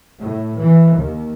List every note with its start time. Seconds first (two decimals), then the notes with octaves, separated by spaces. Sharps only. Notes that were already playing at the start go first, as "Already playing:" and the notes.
0.21 A2
0.59 E3
0.94 D#2